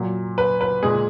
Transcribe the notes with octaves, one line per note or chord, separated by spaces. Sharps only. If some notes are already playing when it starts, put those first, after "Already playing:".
Already playing: A#2 F#3
B4
B4
A#2 G#3 G#4